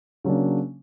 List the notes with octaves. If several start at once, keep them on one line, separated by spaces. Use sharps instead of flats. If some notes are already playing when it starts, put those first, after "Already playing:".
C#3 F#3 A#3 D4